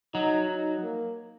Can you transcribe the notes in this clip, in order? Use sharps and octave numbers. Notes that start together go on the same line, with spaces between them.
F#3 D#4
D#4
A#3